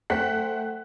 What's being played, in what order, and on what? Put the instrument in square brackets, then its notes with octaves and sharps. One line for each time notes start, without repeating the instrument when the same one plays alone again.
[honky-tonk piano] A3 C5 F#5 G5 F#6 B6